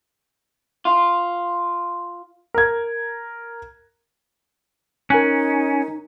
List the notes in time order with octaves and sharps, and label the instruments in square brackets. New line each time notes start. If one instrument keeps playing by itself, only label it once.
[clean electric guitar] F4
[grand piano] A#4 G#6
[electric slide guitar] C#4 [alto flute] D#4 [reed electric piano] A#4 G#5 F#6